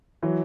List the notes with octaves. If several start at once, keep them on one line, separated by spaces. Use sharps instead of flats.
E3 F#3